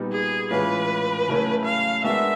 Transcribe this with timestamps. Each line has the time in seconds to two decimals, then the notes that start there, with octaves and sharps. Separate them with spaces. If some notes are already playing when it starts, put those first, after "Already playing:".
Already playing: A#2 G3 B3 D#4
0.12 G#4
0.51 A2 E3 G#3 C#4 F4 B4
1.28 C#3 F#3 A3 C#4 E4
1.65 F5
2.03 G#3 B3 D4 F#4 A#4 E5